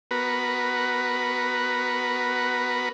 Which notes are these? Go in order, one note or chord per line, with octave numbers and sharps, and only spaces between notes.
B3 F#4 A#4 B4